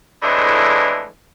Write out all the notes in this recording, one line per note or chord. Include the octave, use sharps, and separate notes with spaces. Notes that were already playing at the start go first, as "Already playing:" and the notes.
F2 A2 E3 G#3 D4